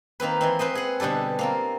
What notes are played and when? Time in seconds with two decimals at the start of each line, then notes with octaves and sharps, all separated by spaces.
0.20 D#3 A#3 C4 B4
0.41 E3 G#3 C4
0.59 C4 B4 C5 D#5
0.75 G#4 F#5
1.00 B2 D3 G3 G4 A4
1.39 A#3 C4 F4